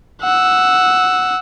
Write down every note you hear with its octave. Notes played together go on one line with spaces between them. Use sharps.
F#5 E6